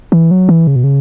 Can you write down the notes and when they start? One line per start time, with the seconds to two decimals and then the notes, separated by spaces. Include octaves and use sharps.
0.12 E3
0.31 F#3
0.49 E3
0.67 C#3
0.76 B2
0.84 C#3